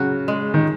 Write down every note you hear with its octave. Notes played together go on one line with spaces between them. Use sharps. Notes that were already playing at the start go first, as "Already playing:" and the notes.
Already playing: C#3 F#3 F#4
G#3
D#3